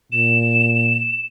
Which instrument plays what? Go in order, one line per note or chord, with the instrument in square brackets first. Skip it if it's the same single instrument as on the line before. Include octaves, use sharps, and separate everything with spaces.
[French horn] A#2 [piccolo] E7